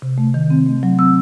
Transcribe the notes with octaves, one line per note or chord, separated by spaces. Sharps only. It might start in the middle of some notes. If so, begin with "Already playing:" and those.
C3
A3
D#3
C4
A3
F#3
C4 E6